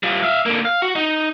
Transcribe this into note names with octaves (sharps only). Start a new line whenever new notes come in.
G3 F4
E5 F5
D3 A#3
F5
F#4
D#4